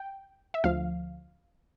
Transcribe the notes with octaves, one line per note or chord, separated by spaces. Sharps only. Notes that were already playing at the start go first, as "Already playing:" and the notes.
Already playing: G5
E5
D2 D3 F3 F5